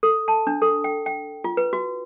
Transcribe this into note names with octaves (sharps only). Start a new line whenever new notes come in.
A4
A5
D4
A4
G5
G5
F4
B4
F#4